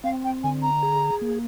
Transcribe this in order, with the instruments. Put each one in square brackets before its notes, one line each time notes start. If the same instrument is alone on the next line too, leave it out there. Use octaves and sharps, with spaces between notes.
[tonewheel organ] C4 [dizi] F5
[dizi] G5
[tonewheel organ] D3 [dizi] G#5
[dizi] A#5
[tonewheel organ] G#4
A#3